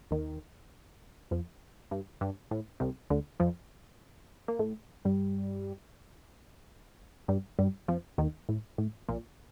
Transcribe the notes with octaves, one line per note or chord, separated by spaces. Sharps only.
D#2 D#3
F2 F3
G2
G2
A2
C2 C3
D2 D3
F2 F3
A#3
A2 A3
G2 G3
G2 G3
G2 G3
F2 F3
D#2 D#3
A2
A2
A#1 A#2